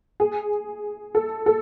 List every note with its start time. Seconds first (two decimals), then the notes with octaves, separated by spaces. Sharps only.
0.20 G#4
1.15 A4
1.46 A4